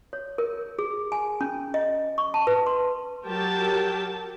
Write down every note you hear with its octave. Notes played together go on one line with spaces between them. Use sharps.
C#5
A#4
G#4
G#5
C#4
D#5
C#6
A5
B4
C6
F#3 G4 A#4 G5 A5